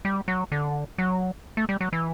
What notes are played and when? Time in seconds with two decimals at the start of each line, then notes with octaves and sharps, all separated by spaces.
0.05 G3
0.28 F#3
0.52 D3
0.98 F#3
1.57 A3
1.69 G3
1.81 F#3
1.93 E3